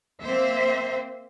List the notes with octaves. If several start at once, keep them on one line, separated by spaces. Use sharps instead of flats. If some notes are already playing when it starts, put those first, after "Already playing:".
A#3 C4 C5 E5